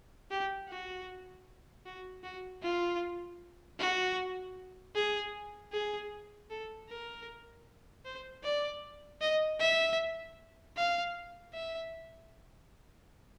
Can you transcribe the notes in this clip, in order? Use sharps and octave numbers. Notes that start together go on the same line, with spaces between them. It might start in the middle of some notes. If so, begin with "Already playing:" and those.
G4
F#4
F#4
F#4
F4
F#4
G#4
G#4
A4
A#4
C5
D5
D#5
E5
F5
E5